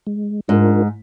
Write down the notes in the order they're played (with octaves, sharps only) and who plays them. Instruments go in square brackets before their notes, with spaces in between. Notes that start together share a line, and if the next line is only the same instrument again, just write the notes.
[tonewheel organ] G#3
[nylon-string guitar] G#2 [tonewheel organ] D4 F4 A#4